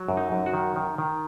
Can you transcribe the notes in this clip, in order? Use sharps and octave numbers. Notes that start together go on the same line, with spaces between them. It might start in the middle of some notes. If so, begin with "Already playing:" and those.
Already playing: F#3
F#2
D#4
F#2
F#4
D#3
D#3
D#3